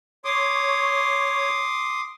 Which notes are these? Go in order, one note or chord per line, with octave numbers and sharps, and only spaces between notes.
C#5 C6 D6 D#6